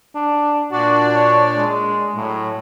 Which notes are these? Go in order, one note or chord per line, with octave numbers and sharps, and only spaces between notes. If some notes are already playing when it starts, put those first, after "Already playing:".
D4
A#2 D4 F#4 D5
C#5
G#3
A2 F#3